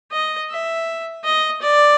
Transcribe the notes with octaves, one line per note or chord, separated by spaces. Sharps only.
D#5
E5
D#5
D5